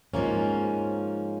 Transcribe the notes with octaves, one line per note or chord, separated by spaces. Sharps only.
G#2 F3 A#3 C#4